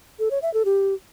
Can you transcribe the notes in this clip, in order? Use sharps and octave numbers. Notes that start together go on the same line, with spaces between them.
A4
C#5
E5
A4
G4